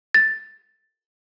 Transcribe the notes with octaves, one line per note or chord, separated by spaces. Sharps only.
A6